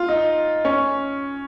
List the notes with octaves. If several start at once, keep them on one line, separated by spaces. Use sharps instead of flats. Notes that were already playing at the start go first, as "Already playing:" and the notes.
Already playing: F4
D#4
C#4